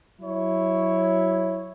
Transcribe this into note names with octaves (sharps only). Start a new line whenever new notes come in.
F#3 E4 C#5